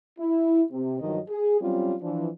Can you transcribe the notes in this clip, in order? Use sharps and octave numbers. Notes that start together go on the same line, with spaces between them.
E4
C3
G2 D#3 F3 F#3 D#5
G#4
F#3 G3 C4 C#4 F4
E3 F3 D4